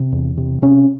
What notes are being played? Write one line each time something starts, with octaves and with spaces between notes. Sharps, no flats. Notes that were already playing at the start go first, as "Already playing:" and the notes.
Already playing: C3
E2
C3
C3 C#4